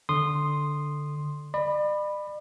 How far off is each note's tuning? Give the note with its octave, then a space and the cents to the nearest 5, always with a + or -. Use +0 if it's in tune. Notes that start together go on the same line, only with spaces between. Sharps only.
D3 +0 C6 +0 D#6 -15
D5 +40 B5 +0